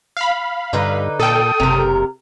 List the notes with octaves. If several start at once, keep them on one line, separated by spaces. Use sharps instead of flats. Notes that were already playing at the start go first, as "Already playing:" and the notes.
F5 B5
G2 D3 D#4 B4
A#2 A4 G5 D#6
F#1 C3 A#4